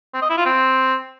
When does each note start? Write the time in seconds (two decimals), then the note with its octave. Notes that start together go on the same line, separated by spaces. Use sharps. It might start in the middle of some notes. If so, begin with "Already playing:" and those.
0.14 C4
0.22 D#5
0.30 E4
0.38 F4
0.45 C4